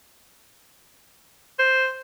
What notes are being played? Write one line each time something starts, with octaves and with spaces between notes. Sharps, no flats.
C5